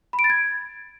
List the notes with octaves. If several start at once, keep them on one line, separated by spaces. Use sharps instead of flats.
B5
D7
A6
G#6